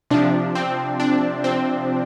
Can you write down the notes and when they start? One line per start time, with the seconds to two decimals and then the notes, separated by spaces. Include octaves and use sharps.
0.10 C3 F3 D4
0.55 C4
1.00 D4
1.44 C4